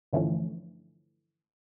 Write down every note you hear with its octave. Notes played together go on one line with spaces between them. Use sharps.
G2 D3 E3 F3 A3 C#4